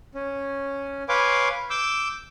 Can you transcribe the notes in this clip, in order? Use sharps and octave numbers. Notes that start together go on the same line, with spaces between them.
C#4
B4 C#5 F5 G#5 C6 D6
D6 E6 G6